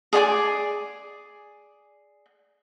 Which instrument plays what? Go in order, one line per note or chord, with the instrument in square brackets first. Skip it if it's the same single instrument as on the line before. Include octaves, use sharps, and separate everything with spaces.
[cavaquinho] G#4 D5 G#5 D6